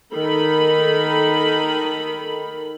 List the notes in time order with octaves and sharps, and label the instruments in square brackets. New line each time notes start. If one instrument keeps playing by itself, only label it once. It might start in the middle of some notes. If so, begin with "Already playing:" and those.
[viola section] D#3 D#4 A4 A#4 B5